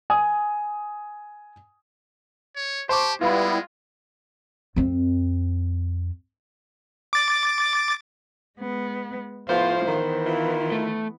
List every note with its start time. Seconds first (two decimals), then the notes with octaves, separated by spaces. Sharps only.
0.10 G#5 D#6
2.56 C#5
2.89 G4 C5 A5 C#6 D6
3.21 G3 G#3 B3 E4 F4 B4
4.76 F2 C4
7.13 D6 A6
8.59 G#3 B3
9.49 A2 F3 B3 F4 C5
9.88 D#3 E3 B3
10.26 E4 F4
10.72 A3